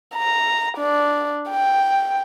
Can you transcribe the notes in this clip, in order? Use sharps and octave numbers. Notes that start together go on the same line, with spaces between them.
A#5
D4
G5